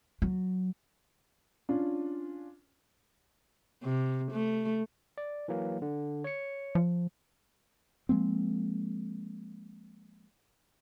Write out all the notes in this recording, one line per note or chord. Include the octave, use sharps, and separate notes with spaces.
F#3
C#4 D4 F4
C3
A3
D5
E3 F#3 A#3
D3
C#5 C#7
F3
F3 G#3 A#3 C4